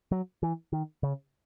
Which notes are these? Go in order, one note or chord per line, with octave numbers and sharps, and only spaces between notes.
F#3
E3
D#3
C#3